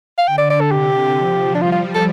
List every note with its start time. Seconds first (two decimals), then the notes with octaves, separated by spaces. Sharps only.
0.18 F5
0.27 D3 G5
0.38 D5
0.50 D5
0.61 A4
0.71 C3 G4
1.17 F3
1.55 D4
1.61 G3 F4
1.72 F4
1.94 A4